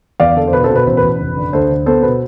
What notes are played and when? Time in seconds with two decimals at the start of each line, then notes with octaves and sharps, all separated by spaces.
0.20 E2 D5 F5
0.36 D3 A4
0.48 C5
0.53 B2 B4
0.64 A4 C5
0.70 B2
0.76 B4
0.86 A1 C5
0.97 B4
1.03 A1
1.20 F1
1.37 D3
1.53 D2 A4 C5
1.69 D3
1.86 B3 A4 C5
2.03 B2 B4